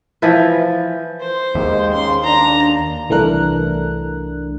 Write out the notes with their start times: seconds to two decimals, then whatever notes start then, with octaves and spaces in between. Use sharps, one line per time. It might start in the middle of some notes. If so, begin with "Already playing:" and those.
0.22 E3 F3 E4 B4
1.20 C5
1.55 D#2 G#3
1.93 C#3 C6
2.24 D4 A#5
3.09 C2 E3 A3 D4 A#4 F#6